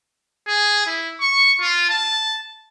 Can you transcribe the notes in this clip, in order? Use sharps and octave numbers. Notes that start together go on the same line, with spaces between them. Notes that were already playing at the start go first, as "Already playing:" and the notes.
G#4
E4
C#6
F4
A5